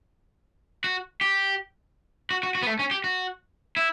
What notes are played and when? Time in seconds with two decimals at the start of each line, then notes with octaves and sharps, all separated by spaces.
0.84 F#4
1.21 G4
2.31 F#4
2.43 F#4
2.55 F#4
2.63 B3
2.67 A3
2.79 C#4
2.91 G4
3.04 F#4
3.77 E4